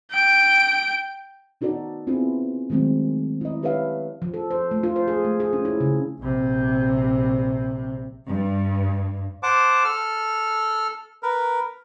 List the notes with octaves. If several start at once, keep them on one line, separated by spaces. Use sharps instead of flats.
G5 D7
B3 D#4 F#4 A4 D5
B3 C4 E4 F4 G#4
D#3 F#3 G#3 A3 C4
E4 D#5
G4 A4 B4 C#5 E5 F5
F3
A4
C5
A3
F4
C5
G#4
A3
G#4
C#4
E4
C#3
A#1 C3
G2
C5 F#5 A5 D6
A4 F6
A#4 B4